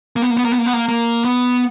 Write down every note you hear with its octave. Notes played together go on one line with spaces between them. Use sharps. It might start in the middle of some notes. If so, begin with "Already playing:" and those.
A#3
B3
A#3
B3
A#3
B3
A#3
B3
A#3
A#3
B3